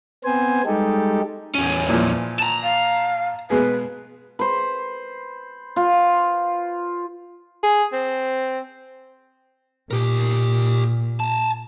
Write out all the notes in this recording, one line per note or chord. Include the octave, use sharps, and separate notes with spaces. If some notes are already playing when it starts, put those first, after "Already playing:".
B3 C4 C5 G#5
G3 G#3 D#4 G4 A4
E2 C#4
A#2 E3 F3
A5 A#5
F5
B2 G#3 G#4 B4
B4 C5
F4
G#4
C4
A#2 G4 A#4
G#5 A5